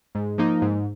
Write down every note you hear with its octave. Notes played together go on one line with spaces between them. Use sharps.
G#2
F3 A#3 D#4
G#2